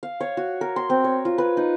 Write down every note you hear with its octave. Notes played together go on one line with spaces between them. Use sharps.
F5
C#5
F#4
A#4
C6
C4
C#5
F4
B4
D#4